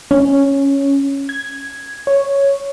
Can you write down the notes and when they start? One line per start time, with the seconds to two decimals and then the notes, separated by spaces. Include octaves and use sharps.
0.11 C#4
1.29 G#6
2.07 C#5